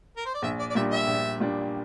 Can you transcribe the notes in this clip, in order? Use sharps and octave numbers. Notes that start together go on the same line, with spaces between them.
A#4
C5
D5
A#1 E5
D5
D5
A#2 G3 D4 E5
E5
A#1
A#2 G3 D4